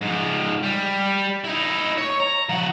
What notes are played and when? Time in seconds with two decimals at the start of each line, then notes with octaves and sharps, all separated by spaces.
0.02 G#2 F3
0.63 G3
1.44 D#4 E4
1.97 C#5
2.20 A#5
2.49 F3 F#5